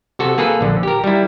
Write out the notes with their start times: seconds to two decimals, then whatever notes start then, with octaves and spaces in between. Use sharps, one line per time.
0.19 C3 F#4 A4
0.38 A#3 G#4 A4 B4
0.61 A#1 D3
0.83 G4 A#4
1.04 G3 E4